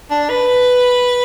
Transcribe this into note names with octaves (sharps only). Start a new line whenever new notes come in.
D4
B4